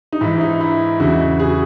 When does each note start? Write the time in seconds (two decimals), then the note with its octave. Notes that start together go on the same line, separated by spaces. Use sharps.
0.13 D#4
0.21 G#2 E3 E4
0.41 D#4
0.60 E4
1.00 E2 C#3 E3 E4 F#4
1.39 F#4 G#4